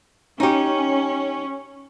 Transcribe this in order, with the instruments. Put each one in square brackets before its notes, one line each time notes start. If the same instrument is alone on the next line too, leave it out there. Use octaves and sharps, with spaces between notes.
[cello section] C#4 [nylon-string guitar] D#4 G4